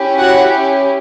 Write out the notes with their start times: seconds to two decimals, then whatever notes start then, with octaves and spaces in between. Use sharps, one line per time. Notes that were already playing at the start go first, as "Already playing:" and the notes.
Already playing: C#4 E4 G4
0.18 F#4 F#5